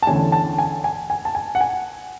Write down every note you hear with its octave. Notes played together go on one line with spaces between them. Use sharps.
A5
E2 D3 A3 C#4 G#5
A5
G#5
G#5
G#5
A5
G#5
F#5
G#5